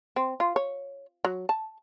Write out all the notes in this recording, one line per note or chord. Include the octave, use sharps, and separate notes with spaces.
C4
F4
C#5
F#3
A5